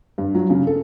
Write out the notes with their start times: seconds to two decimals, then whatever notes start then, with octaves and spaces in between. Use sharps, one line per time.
0.18 G2
0.35 F#3
0.50 C#3
0.67 A4